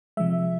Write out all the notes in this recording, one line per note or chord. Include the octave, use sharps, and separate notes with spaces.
C3 F3 G#3 E5